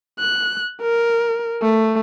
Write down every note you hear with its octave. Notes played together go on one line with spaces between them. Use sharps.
F#6
A#4
A3